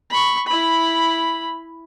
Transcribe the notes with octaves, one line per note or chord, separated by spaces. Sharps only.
B5 C#6
E4 B5